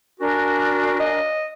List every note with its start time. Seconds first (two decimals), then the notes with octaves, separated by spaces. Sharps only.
0.20 D4 F#4 A#4 G#5
1.00 D#5